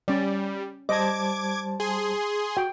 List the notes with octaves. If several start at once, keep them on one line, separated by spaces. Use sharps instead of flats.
G3 C#4 D5
G3 C5 D#5 A5 D6 G#6
G#4 C6
F#4 G5